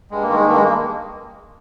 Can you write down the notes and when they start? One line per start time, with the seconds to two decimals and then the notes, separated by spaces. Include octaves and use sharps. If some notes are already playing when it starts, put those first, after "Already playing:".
0.11 G2 G#3
0.22 A#3
0.29 D#3 G#3
0.46 G2 A#3
0.55 G#3
0.65 A#3